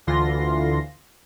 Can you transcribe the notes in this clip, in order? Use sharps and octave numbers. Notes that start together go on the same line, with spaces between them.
D2 D3 E3 F4 C6 A#6